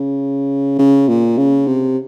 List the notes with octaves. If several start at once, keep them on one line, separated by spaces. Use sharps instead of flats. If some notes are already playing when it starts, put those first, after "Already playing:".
Already playing: C#3
C#3
A#2
C#3
C3